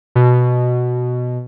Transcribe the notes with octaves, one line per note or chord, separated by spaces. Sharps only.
B2